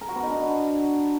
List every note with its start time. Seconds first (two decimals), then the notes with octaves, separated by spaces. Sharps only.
0.01 A#4
0.08 F#4
0.15 B3
0.22 D#4
0.30 D4